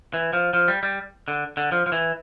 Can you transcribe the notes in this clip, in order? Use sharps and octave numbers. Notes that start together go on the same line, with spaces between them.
E3
F3
F3
G3
G3
D3
D3
F3
F3
E3